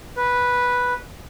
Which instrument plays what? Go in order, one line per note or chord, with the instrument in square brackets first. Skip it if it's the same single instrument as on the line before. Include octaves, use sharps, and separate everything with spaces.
[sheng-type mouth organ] B4